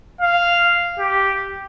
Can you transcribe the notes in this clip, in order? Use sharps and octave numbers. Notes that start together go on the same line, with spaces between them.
F5
G4